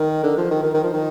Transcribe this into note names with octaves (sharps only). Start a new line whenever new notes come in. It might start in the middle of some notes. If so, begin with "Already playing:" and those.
Already playing: D#3
D3
F3
D#3
D#3
D#3
F3
D#3